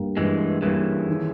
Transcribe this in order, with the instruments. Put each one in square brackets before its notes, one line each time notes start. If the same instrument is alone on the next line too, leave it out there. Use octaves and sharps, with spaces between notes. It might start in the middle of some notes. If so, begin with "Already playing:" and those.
Already playing: [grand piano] G2 G3 A#3
[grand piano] G2 [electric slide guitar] E3 G#3
[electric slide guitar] C#3 E3 [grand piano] G3 A#3
[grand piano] D#3